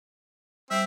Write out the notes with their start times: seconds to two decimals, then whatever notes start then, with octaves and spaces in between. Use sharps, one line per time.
0.71 G3 C4 E5